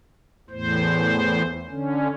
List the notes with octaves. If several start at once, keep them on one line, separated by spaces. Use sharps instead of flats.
E2 A2 C5
D3 C#4